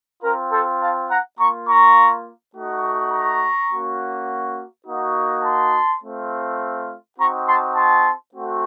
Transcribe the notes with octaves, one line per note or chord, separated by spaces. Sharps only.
C4 F4 A#4
A4 C5
F5 A5
F#5 A#5
A#3 F4 A#5 C#6
A#5 C#6
A3 D#4 F#4
A#5 C#6
A#3 C#4 F#4
A#3 D#4 F#4
A5 C6
A3 C4 F4
C4 D#4 F#4 A#5 C#6
A5 C6
A5 C6
A3 C4 F#4